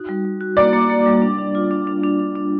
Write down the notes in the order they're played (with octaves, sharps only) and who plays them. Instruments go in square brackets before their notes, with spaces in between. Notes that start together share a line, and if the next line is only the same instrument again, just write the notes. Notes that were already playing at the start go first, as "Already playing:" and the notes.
Already playing: [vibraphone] D#4 F#4
G3
G3
F#4
[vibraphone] A#3 [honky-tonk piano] D5
[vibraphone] A#3
A#3
G3
D4
D4
F4
D4
D4
D4
D4
D4